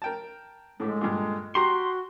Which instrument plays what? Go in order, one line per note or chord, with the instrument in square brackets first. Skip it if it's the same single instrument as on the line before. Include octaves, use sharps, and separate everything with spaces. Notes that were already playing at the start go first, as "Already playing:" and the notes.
[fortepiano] A#4 G5 A5
[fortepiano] A2 D3 A3 [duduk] G#3
[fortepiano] G2 A#2 D3
[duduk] F#4 [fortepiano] G4 A#5 [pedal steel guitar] C6